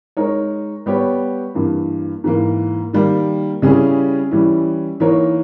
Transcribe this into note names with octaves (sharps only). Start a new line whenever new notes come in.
G#3 D#4 A#4 C#5
G3 B3 G4 C#5
G2 E3 A#3
G#2 E3 A#3
D#3 G3 A#3
C#3 G3 C#4 E4 G#4
E3 G3 C#4 E4
E3 A#3 D#4 A#4 C#5